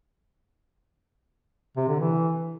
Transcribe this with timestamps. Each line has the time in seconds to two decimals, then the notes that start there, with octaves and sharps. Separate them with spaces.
1.77 C3
1.88 D3
2.00 E3